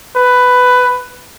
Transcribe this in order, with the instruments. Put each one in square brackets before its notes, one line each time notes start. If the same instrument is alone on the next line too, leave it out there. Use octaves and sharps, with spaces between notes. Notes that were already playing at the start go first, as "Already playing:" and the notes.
[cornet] B4